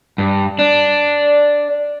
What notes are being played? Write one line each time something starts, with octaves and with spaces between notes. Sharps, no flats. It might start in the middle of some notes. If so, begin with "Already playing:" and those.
G2
D4